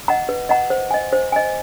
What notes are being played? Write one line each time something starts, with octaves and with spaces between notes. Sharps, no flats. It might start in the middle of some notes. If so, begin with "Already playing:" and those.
D#5 F#5 A#5
B4
D#5 F#5 A#5
C5
D#5 G#5
C5
D#5 G#5